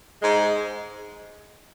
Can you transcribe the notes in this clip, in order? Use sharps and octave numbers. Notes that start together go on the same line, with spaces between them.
G#2 G#3